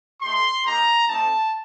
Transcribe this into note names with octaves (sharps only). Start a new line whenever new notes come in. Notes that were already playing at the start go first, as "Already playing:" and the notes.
A3 D#4 G4 C6
A#3 D#4 G4 A#5
A3 C4 D#4 A5